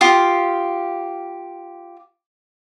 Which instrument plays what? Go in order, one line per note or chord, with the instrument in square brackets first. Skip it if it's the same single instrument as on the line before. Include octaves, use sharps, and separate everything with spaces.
[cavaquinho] F4 G4 D#6